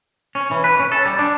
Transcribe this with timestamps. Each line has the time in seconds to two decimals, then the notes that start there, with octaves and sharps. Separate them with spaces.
0.35 C#4
0.51 E3
0.64 B4
0.80 C#4
0.92 A4
1.06 G3
1.19 D4